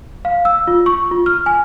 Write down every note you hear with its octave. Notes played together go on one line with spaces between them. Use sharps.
F5
E6
F4
C#6
F4
F6
G#5